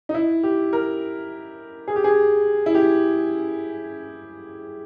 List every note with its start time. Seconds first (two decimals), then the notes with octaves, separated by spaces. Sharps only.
0.09 D#4
0.14 E4
0.43 G4
0.73 A#4
1.88 G#4
1.96 G4
2.04 G#4
2.66 E4
2.75 G4